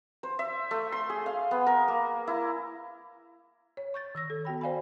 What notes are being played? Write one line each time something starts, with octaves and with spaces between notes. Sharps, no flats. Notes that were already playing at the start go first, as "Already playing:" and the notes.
C5
E5
A3
C6
G#4
F5
B3
A#4
A#3
E4
C#5
C#6 G6 A6
D#3 E6 A#6
A4
B3 F#4 G5 B5
C5 D5 F5 G#5 B5